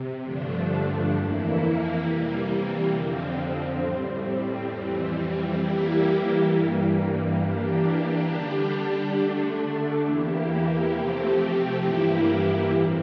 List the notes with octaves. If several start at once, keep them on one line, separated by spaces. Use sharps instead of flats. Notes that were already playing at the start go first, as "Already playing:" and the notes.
Already playing: C3
G2 D3 F3 A3 D4
F2 E3 A#3 E4
C3 E3 G3 A#3
F2 D3 F3 C4
A2 G3 C4
F2 E3 G3 C4
E3 G3 A#3 E4 G4
G2 E3 G3 A#3
E3 A#3 D4 G4
D3 G3 D4 G4
D3 A3 D4
E2 E3 A#3 E4 G4
C3 F3 A3 C4 G4
G2 E3 A#3 E4 G4
A2 E3 G3 C4